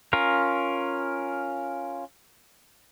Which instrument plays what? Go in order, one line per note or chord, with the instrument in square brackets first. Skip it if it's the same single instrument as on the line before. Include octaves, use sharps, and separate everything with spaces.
[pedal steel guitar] C#4 F4 A#4